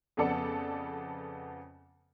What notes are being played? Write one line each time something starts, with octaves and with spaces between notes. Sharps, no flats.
F2 C#3 B3 A4 D5 C#7